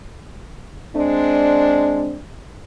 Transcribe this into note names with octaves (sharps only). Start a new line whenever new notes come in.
G#3 C4 D4